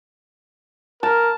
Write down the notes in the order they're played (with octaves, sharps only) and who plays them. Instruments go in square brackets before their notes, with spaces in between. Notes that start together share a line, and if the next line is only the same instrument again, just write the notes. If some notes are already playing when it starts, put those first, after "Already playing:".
[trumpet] A#4 [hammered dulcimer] A5